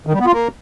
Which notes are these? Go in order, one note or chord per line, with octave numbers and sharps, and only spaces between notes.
D#3
G3
B3
F4
A#3